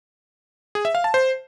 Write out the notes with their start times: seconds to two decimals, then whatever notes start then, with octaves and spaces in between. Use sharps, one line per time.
0.75 G#4
0.85 E5
0.95 F5
1.04 A5
1.14 C5